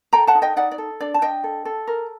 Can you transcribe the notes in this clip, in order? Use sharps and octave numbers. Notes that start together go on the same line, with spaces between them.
A4 G5 A#5
F#5 A5
D#4
D#5 G5
D#4 D5 F#5
D5
A4
D4 D5
A5
D4 D#5 G5
A4
A4
A#4